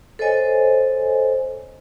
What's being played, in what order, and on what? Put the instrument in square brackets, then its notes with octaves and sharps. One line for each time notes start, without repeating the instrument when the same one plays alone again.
[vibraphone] A4 C5 C#5 D#5 G#5